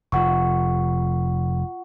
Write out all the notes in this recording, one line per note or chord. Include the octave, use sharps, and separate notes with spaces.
F1 F4 F#5 C#6